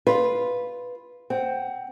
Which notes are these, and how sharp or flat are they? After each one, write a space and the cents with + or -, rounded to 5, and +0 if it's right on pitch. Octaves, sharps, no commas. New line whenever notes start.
F4 +0 B4 -5
C4 +0 F#5 +20